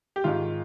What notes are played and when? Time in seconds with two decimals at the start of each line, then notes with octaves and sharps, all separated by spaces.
0.16 G4
0.24 G#2 D#3 F4